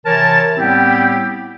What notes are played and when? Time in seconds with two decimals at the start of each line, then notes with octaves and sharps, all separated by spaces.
0.06 C3 E3 A#4 C#5 A5
0.57 A2 G3 B3 C4 E4 G4